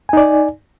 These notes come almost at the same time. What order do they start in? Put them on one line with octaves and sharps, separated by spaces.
G#5 D#4 D5